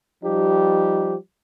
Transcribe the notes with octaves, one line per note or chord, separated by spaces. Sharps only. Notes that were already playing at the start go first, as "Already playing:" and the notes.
F3 G3 D#4 G4